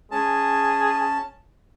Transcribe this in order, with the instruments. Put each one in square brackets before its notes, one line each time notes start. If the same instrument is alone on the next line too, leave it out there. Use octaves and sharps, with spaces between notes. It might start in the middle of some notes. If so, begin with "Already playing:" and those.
[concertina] C#4 A5 [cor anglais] G#4